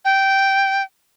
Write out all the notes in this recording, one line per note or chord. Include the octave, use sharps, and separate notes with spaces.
G5